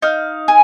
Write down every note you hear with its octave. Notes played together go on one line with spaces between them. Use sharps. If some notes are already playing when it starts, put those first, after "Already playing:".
D#4 F5
G#4